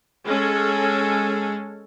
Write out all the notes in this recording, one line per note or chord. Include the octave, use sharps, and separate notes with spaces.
G#3 C#4 G#4 A4